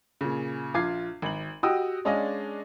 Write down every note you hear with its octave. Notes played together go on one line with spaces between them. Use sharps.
A#2 C#3
A#1 F4 D6 G#6 C7
G#1 F#7
F#4 G4 D#5 G5 D#6 E6
G#3 C#4 D4 D5 D#5 F5